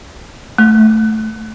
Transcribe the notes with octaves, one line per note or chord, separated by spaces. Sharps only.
A3